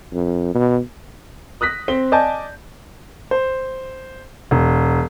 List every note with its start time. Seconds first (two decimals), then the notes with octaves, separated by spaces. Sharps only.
0.13 F2
0.55 B2
1.61 D#6 F#6 A#6 B6
1.88 C4 G7
2.12 D5 D#5 G#5 A5 G6
3.31 C5
4.51 E1